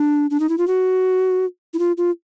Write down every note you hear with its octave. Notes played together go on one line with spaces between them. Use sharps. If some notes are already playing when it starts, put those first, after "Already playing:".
Already playing: D4
D4
D#4
E4
F4
F#4
E4
F4
F4